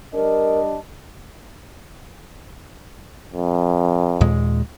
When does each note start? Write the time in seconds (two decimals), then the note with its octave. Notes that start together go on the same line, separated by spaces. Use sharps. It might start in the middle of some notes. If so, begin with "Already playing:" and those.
0.14 G3 D4 A#4 D#5
3.33 F2
4.21 D#2 A#2 G#3